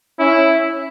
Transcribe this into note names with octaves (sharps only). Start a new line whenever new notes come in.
C#4 E4